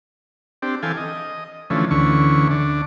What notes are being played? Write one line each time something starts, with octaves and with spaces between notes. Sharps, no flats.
C4 D4 G4
E3 A4 F5 G5 G#5
D#5
D3 E3 F3 A3 C#4
D2 D3 E3 C#4 C#6
D3 D4